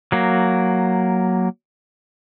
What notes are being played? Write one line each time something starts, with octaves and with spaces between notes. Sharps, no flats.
F#3 A#3